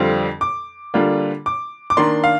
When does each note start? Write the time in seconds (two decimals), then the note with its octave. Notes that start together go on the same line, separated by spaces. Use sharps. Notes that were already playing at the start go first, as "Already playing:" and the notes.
Already playing: F2 D3 G3 C4 F4
0.41 D6
0.94 D3 G3 A#3 D4 F4
1.46 D6
1.90 D6
1.97 D#3 A#3 D4 C6
2.24 F5